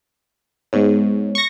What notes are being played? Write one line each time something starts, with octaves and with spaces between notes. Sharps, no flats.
G#2 G#3 B3 C#5
C#6 A#6